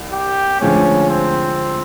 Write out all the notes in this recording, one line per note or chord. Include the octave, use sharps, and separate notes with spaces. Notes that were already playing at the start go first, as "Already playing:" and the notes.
Already playing: C2
G4
D2 D3 F3 G#3 C#4
C4